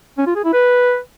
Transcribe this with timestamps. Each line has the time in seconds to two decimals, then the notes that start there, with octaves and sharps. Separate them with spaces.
0.18 C#4
0.27 F4
0.35 G#4
0.44 E4
0.53 B4